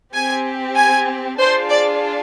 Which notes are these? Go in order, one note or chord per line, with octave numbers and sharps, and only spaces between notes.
C4 G4 G#5
G#5
D4 F4 G#4 C5
D5